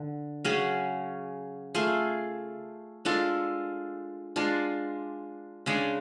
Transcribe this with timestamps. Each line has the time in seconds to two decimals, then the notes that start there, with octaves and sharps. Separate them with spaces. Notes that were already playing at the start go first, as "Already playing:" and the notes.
Already playing: D3
0.45 C#3 F#3 C#4 G#4
1.74 A3 F4 G#4
3.05 G#3 D4 F4 A4
4.36 G#3 D4 F4
5.66 C#3 G#3 D4 G#4